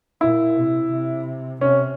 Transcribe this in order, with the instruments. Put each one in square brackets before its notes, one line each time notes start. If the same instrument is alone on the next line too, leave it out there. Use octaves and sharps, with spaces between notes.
[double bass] A#2 [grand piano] E4
[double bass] C3
C3
[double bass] C3 [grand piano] C#4